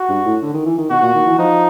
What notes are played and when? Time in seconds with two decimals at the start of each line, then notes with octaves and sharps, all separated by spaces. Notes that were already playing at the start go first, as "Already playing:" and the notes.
Already playing: F#4
0.09 G2
0.25 A2
0.42 D3
0.54 D#3
0.66 E3
0.78 D#3
0.90 B2 F#4
1.02 A#2
1.15 D#3
1.26 E3
1.39 F3 D#4